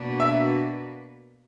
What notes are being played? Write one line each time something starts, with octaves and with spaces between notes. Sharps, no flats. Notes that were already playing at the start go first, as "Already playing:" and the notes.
Already playing: B2 A#3 D4 F#4 B4
E5